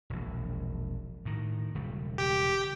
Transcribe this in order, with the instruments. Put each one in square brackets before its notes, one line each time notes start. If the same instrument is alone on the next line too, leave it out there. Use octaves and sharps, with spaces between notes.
[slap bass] E1 A#1
A2 D#3
E1 C#3 G3
[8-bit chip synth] G4 G5